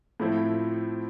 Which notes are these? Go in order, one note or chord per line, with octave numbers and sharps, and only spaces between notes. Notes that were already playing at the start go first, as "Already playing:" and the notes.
A2 F3 C4 E4